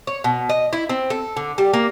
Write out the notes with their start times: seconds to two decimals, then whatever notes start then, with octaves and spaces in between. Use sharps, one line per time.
0.07 C#5
0.24 B2
0.49 D#5
0.73 E4
0.89 C4
1.10 A4
1.37 D3
1.58 G3
1.73 A#3